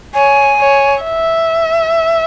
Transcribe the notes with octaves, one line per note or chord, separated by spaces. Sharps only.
C#5 G#5
C#5
E5